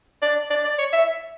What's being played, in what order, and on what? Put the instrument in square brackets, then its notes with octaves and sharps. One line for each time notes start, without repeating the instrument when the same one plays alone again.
[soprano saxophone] D5
D5
D5
C#5
E5